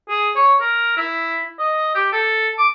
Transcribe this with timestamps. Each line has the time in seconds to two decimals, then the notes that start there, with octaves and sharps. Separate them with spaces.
0.09 G#4
0.35 C#5
0.61 A#4
0.97 E4
1.59 D#5
1.95 G4
2.12 A4
2.58 D6